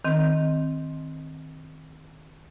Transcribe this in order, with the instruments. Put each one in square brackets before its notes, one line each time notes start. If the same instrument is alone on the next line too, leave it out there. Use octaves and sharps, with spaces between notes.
[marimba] D#3 C4